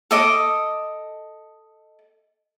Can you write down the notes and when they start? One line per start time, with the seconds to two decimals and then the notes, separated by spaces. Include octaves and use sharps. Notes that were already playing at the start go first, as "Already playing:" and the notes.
0.11 A4 D#5 D6 D#6